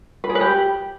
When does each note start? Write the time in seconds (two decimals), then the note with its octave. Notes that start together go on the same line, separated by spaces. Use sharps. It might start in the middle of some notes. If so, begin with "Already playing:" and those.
0.24 B4
0.29 G#4
0.35 B4
0.41 G4